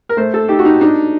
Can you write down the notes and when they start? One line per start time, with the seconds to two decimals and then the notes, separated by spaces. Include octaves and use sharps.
0.09 A#4
0.17 A3 C5
0.34 A4
0.49 D#4 G4
0.59 F#4
0.65 D#4
0.81 D4 D#4